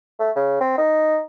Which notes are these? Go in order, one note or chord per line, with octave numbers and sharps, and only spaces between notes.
A3
C#3
C4
D#4